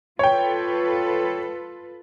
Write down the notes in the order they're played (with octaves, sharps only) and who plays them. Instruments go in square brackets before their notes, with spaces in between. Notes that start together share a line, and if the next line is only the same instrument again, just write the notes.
[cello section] F4 A4 B4 [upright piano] C#5 G5